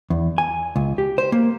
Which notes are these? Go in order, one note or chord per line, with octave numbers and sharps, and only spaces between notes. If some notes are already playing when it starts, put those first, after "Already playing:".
E2
G#5
C#2
G4
C5
A#3